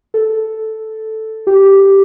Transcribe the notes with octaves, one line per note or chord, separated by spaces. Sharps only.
A4
G4